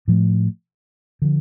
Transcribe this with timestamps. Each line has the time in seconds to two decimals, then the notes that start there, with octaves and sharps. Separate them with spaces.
0.08 A2 F3 A3
1.22 D3 F3